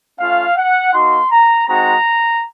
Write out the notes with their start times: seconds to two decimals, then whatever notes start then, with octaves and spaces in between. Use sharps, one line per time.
0.19 A3 C#4 F4 F5
0.56 F#5
0.93 A#3 D#4 F#4 C6
1.31 A#5
1.68 G#3 C4 D#4 F#4 A#5